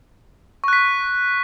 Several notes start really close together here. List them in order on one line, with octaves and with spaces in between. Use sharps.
C#6 F#6 B6